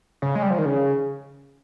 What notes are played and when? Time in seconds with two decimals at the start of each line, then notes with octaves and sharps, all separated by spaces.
0.22 C#3
0.35 G#3
0.43 G3
0.50 F3
0.58 D#3
0.65 C#3